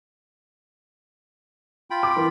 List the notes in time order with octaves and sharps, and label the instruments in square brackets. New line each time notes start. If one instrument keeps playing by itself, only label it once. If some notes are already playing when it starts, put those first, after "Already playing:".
[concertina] F4 G5 B5
[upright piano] D6
E3 A#4